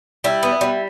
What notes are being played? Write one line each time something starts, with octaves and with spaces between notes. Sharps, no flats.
G3 E4
B3
G3